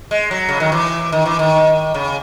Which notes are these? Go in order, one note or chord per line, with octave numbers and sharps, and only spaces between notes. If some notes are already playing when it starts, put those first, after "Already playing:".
G#3
F#3
C#3
D#3
E3
D#3
E3
D#3
C#3